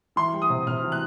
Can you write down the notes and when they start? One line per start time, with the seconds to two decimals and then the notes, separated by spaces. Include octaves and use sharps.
0.16 E3 C6
0.33 G3
0.42 D#6
0.49 C3
0.67 C3 F6
0.83 E3
0.92 F#6